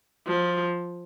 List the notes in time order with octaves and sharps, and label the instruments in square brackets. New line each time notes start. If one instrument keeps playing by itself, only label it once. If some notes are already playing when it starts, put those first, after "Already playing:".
[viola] F3